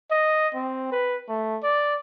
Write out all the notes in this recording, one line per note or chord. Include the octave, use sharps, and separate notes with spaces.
D#5
C4
B4
A3
D5